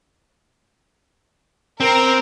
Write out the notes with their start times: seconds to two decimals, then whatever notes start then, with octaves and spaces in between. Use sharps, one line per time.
1.80 C4 A#4